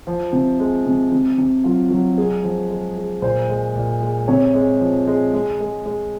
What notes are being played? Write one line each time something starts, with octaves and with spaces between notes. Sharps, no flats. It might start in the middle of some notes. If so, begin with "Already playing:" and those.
F3
C3
G#3
C3
C3
C3
F#3 F4
F#3 F#4
G#3 G#4
F3
G#3
G#3
A#2 C5
G#3
A#2
G#3
C3 C#5
G#3
F3
G#3
G#3
G#3
G#3